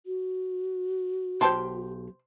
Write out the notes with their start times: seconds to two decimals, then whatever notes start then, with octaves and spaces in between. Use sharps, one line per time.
0.06 F#4
1.41 B1 G4 C5 G5 A5 C6